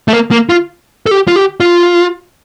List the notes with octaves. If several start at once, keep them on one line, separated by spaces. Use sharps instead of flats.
A3
A#3
A#3
F4
A4
G4
F4
G4
F4